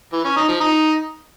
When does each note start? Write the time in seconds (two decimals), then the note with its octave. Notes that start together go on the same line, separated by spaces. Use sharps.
0.13 E3
0.25 C#4
0.37 D#4
0.48 F3
0.60 D#4